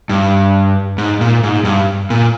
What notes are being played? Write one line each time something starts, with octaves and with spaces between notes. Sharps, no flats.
G2
G#2
A#2
G#2
G2
A#2